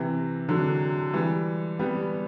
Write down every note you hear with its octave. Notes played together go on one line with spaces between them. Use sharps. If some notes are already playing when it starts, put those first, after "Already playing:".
Already playing: C3 E3
D3 F#3
E3 G3
G3 B3